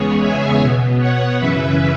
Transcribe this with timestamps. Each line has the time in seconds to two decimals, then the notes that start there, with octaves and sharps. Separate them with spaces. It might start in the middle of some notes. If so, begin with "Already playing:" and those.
Already playing: E2 C#3 G#3 B3 G#4 C#5
0.21 E5 G#5
0.60 B2 B3
0.99 C#5 F#5
1.38 F#2 C#3 E3 C#4 B4 E5